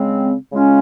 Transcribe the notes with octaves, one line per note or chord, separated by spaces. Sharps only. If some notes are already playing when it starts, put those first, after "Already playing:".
Already playing: C#3 G#3 C4
C#3 G#3 C#4 F4